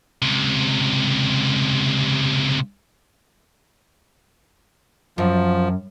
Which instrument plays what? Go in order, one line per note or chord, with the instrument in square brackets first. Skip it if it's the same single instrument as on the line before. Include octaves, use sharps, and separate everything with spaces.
[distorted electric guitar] C#2 C3
[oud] F#2 [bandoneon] F3